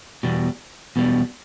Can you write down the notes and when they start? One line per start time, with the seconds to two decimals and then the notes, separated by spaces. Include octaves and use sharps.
0.23 E2 B2 G3
0.96 E2 B2 G3